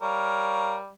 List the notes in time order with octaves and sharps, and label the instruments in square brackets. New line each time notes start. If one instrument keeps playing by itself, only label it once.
[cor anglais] G3 [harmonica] A#4 C#5 F5